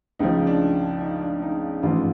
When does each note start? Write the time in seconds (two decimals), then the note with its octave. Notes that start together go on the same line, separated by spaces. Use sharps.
0.19 C#2 C#3 F3 D#4
0.47 D4
1.01 D#4
1.22 D4
1.42 D#4
1.83 A1 G#2 F3 F4